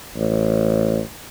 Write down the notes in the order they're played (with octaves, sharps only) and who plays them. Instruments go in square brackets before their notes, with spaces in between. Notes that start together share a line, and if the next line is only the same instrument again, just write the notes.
[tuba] A1